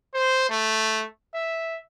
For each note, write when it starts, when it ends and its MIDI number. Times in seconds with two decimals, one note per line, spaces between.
0.14 0.46 72
0.49 1.05 57
1.34 1.79 76